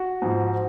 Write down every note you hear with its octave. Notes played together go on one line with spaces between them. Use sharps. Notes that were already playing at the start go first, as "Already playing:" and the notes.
Already playing: F#4
G#2 F3